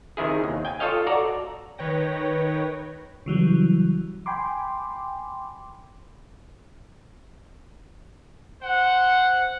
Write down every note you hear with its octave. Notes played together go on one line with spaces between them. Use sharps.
C3 D#3 E4 G#4
D#2
G5 G#5
F4 A4 C#5 D#5 F5
F#4 A4 D5 A#5
D#3 B4 C#5 G5 A#6
C#3 E3 F#3 G3
G5 G#5 B5 C6 D6
C5 F#5